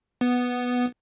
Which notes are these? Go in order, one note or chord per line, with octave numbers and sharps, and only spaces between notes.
B3